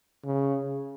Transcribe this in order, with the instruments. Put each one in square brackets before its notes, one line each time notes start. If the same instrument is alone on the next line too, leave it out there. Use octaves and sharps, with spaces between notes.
[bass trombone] C#3